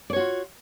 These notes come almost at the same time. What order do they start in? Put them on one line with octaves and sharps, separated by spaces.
D5 C#5 F#4 F4